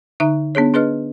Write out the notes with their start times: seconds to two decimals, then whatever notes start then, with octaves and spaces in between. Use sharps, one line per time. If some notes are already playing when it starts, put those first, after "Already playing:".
0.20 D3 D#4 E5 A#5 F#6
0.55 B3 D4 G#4 C#5
0.74 D4 G#4 B4 D#5 F6